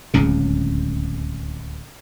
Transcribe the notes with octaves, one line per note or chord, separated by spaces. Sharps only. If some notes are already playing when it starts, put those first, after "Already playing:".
D1 C#2 C#3